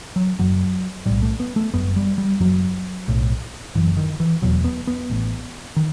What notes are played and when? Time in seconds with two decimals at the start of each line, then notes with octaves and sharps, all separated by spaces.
0.16 F#3
0.39 F#1 F#2 F#3
1.06 B1 A2 G3
1.22 A3
1.40 B3
1.56 A3
1.73 G1 F#2 B3
1.96 G3
2.18 G3
2.40 F#1 F#2 F#3
3.08 B1 A2
3.75 F#1 F#2 E3
3.97 D#3
4.20 E3
4.42 E1 E2 B2 F#3
4.64 B3
4.87 B3
5.10 A1 A2
5.76 D#3